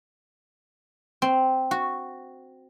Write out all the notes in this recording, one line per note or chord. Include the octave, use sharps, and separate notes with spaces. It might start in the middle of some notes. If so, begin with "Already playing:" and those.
C4
F#4